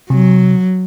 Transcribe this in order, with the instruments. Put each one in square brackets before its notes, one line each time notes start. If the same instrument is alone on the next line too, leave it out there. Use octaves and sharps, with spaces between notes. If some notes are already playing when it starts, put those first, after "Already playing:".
[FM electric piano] C3 [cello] F#3